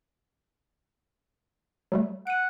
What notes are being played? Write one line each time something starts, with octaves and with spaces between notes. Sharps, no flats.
F#3 G3 A3
F#5 D7 D#7